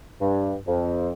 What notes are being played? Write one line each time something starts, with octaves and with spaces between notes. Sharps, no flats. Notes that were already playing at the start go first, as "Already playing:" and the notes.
G2
F2